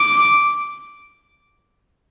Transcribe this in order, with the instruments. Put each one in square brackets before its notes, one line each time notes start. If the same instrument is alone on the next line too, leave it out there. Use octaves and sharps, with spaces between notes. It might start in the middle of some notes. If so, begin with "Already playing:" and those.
Already playing: [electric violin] D6